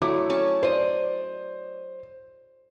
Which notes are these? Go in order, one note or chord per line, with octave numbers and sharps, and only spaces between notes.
F#3 A3 E4 D6
C#4 A5 C#6
C5 D5 D#5